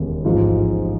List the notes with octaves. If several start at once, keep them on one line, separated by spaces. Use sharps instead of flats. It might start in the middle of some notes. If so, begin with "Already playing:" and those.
Already playing: E1 D#2 C#3
A1 G#2 F3